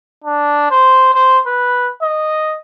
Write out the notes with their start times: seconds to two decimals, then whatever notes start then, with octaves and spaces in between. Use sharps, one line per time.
0.24 D4
0.71 C5
1.14 C5
1.46 B4
2.02 D#5